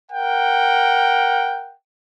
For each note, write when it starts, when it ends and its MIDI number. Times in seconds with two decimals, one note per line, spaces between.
0.11 1.73 70
0.11 1.73 78
0.11 1.73 79